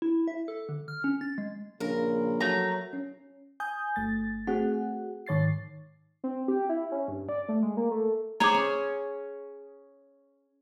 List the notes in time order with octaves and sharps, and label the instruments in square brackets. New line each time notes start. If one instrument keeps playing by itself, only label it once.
[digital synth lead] E4
E5
A4
D3
F6
C#4
A6
G#3
[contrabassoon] A#1 [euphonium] C#3 [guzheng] A#4
[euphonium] F#3 [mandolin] A3 A#5
[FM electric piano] C#4
G#5 D#6 G6
G1 A3 A6
A3 C4 F#4 G#4 F#5
G#2 D#3 C#5 A6 C7
[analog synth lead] C4
G4
E4
C#4
G2
D5
A3
G#3
A#3
A3
[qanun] G#4 C5 C#5 [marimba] A#5 D6
[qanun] C#4